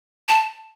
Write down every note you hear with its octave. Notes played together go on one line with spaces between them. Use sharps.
A5